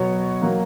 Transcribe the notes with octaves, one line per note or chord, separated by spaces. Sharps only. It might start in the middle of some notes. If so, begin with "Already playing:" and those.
Already playing: B2 F#3 B3 C#5 C#6
F#3 A#3